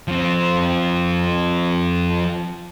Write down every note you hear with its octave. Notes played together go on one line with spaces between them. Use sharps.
F3 C4